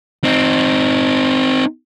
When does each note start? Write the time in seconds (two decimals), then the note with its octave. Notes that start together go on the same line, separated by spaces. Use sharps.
0.24 C4 D#4